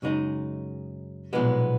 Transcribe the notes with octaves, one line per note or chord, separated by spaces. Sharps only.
F#2 C#3 G#3 D#4
B1 A#2 F3 G#3 B3